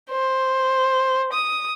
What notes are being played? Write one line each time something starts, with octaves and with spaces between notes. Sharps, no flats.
C5
D#6